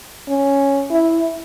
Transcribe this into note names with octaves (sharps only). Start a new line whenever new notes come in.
C#4
E4